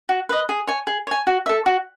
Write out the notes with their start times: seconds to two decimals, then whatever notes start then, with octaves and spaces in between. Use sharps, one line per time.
0.09 F#4
0.29 B4 D#5
0.49 G#4
0.67 C#5 G#5
0.87 G#4
1.07 C#5 G#5
1.27 F#4
1.46 A4 E5
1.66 F#4